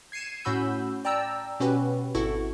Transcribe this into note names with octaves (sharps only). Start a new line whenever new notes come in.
G#6 C7 C#7 D#7 E7
A2 C#4 F#4 B5 E6 G6
D5 G5 A5 A#5 E6
B2 C#4 F#4 G4 B4
G#1 E4 F#4 A4 C#6